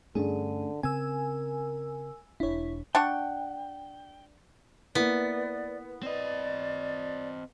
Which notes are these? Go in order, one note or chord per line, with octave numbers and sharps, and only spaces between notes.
G2 D3 A3 C#4 D4 G#4
C#3 C4 A#4 G#5 E6
E1 D4 E4 C#5
D4 F#5 G5 C#6
A#3 B3 E4 D5
C4 D5 D#5